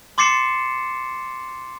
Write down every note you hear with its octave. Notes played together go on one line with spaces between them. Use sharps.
C6 D6 A6 C7 C#7 E7